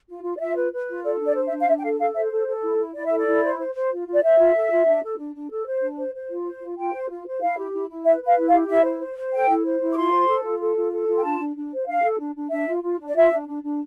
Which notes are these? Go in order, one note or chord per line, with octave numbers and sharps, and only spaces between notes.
F4
F4
D5
F4 E5
B4
B4
F4
A4 D5
D4
D5
C5
E5
D4
F5
D4 E5
G5
A4 F5
A4 F5
C5 E5
A4
A4
E4
E4
E4 D5
E5
A4
D5
E4
C5
C5
C5
F4
F4
D5
C5 E5
F4
A4
F4
D4
A4
D4
D4
A4
C5
D4
C5
C5
F4
C5
F4
F4 G5
C5
F4
C5
E4 F5
G4
E4
E4
B4 E5
B4
F5
E4
F5
G4
E4 E5
C5
C5
C5
A4 G5
E4
C5
E4
D6
F4 C6
C5
A4
F4
A4
F4
A4
F4
G5
D4 A5
D4
D4
C5
D4 F5
A4
D4
D4
D4 E5
F4
F4
D4
D5
F4 E5
D4
D4
D4